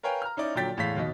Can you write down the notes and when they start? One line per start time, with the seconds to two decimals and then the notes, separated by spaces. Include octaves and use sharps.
0.03 A#4 B4 C#5 F5 G5 G#5
0.22 A#5 F6
0.37 C#4 D#4 E4 D5
0.55 A#2 D3 F#3 G5 A6 B6
0.77 E2 A2 G#3 F5 B6
0.96 D#2 B2 D#5